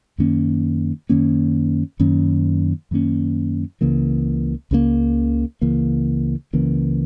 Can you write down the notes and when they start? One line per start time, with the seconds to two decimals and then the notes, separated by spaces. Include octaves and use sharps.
0.18 F#2 D#3 A#3 C#4
1.10 F#2 D#3 A#3 C#4
2.00 F#2 D#3 A#3 C#4
2.91 F#2 D#3 A#3 C#4
3.81 C#2 C#3 E3 A#3
4.71 C#2 C#3 E3 A#3
5.62 C#2 C#3 E3 A#3
6.53 C#2 C#3 E3 A#3